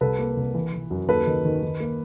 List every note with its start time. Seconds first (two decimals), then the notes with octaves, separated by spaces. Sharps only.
0.01 C2 A4 B4
0.19 A#3
0.37 C2
0.54 E3
0.73 E3
0.91 F#2
1.08 D#2 A4 B4
1.27 D#3
1.45 D#3
1.62 D#3
1.80 A#3